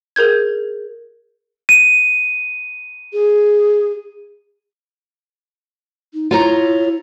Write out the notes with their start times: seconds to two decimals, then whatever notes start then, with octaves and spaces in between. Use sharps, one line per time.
0.16 G#4 A#4 G6 G#6
1.69 D#7
3.13 G#4
6.14 D#4
6.31 E4 F4 C#5 A#5